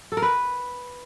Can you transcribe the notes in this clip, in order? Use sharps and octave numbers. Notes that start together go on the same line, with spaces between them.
A4
A#4
B4